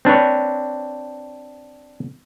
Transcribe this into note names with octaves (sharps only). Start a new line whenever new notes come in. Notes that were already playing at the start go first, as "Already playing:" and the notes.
C4 D4 B4 C#5